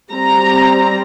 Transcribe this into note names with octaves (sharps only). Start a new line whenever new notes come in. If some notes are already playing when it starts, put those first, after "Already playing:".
G3 C4 A#5